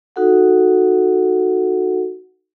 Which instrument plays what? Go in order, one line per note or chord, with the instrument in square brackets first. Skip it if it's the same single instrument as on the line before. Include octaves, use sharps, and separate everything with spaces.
[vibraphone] D#4 F#4 A4 F#5